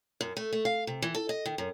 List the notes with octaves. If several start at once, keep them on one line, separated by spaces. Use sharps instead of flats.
F#2
A3
A3
F5
C3
E3
A4
D#5
D#3
F#2